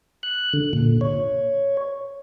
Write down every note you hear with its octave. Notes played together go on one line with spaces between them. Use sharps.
F#6
D3
A#2
C#5